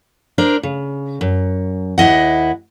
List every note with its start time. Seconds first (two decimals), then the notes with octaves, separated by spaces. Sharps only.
0.38 D4 A#4 C5
0.63 C#3
1.21 F#2
1.98 D#2 E4 D#5 F#5